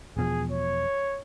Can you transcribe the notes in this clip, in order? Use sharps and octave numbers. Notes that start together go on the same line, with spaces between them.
E1 B2 F3 G#4
C#5